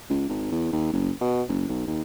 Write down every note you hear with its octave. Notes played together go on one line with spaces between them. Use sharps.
C#2
G#1
E2
D#2
F#1
B2
F#1
B1
D#2